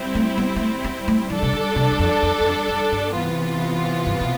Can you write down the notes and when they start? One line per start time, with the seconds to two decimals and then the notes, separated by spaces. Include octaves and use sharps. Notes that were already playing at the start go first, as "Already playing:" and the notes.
Already playing: G3 C4 E4
0.15 A3
0.38 B3
0.56 B3
0.61 A3
0.84 B3
1.08 A3
1.30 E3 G3 D4 A4
1.42 C3
1.53 D3
1.76 C3
1.91 E2
1.99 F2
2.22 F2
2.40 E2
2.45 F2
2.68 F2
2.92 G2
3.14 C3 E3 B3 F4
4.06 G2
4.21 B2